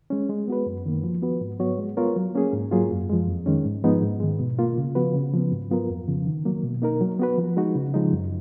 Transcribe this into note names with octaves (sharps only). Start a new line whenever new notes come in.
G#3 C#4
G#3
B3 F#4 B4
F#2
D#3 A#3
F3
B3 F#4 B4
G#2
F#3 B3 F#4 C#5
G#3
B3 F4 A#4 C#5
F#3
A#3 C#4 G#4
G#2
F#3 A#3 F4 G#4
F#2
F3 G#3
F2
D#3 G#3 C#4
G#2
F3 G#3 B3 D#4
G#2
D#3 G#3
B2
A#3 F4
C#3
F3 B3 F#4 B4
C#3
F3 B3
G#2
F#3 B3 F4 A#4
F2
C#3 F3
D#3
F#3 A#3
B2
A#3 D#4 A#4
F#3
B3 F#4 B4
F3
G#3 D#4 F#4
C#3
F3 G#3 D#4
F#2